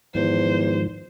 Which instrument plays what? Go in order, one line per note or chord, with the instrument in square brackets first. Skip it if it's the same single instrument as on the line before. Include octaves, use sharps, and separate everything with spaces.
[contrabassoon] E2 [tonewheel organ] G#2 D#3 F3 [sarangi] C5